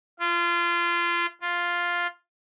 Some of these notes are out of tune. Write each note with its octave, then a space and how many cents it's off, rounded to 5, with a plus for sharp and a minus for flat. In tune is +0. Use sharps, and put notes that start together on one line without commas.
F4 -25
F4 +0